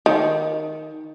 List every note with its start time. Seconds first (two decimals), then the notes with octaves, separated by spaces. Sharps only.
0.06 D#3